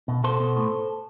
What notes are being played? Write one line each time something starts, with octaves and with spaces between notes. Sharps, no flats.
B2
B2 A4 C5
B2
A2